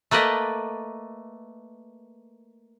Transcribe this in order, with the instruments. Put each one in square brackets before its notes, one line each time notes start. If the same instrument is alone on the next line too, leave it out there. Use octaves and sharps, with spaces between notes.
[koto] A3 A#3 B4 D5 D#5